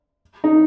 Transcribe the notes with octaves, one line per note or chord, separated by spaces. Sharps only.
D#4